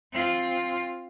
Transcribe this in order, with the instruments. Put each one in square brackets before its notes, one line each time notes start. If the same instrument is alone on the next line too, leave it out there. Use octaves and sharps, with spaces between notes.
[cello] C4 F4